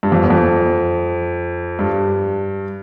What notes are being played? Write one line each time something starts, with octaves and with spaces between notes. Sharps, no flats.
G2
F2
E2
F2
G2